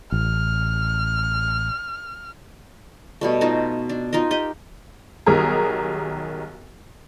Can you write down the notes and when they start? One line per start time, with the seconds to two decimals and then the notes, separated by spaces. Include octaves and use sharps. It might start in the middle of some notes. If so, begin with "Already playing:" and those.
0.12 A1 F6
3.21 B2 G3 A3
3.41 B3 D#4 F4 F#4
3.89 D4
4.13 D#4 F4 A#4 D#5
4.31 G4 D#5
5.26 B1 D#3 G3 G#4 A#4 A#5